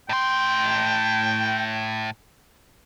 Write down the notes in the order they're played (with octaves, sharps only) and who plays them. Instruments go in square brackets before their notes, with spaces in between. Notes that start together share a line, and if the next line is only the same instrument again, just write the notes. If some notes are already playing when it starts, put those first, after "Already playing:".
[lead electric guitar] A2 C6 [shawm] G5